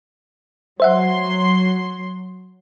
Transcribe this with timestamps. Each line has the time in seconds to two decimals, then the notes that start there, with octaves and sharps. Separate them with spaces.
0.80 F#3 C5 E5 F#5 C6